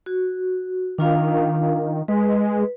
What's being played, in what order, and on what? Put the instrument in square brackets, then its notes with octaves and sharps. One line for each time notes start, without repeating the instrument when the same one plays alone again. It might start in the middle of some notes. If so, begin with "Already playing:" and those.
[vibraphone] F#4
[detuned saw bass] D#3 [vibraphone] D4 F4 F5
[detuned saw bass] G#3 [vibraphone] B4